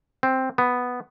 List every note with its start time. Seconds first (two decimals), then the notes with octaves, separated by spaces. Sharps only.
0.23 C4
0.58 B3